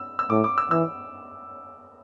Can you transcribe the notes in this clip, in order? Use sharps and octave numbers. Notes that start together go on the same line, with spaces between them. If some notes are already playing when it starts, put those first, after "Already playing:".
Already playing: E6
E6
A2 D6
D6
E6
E3 E6